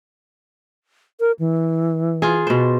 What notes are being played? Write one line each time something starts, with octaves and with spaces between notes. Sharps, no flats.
A#4
E3
F4 G#4
B2 C5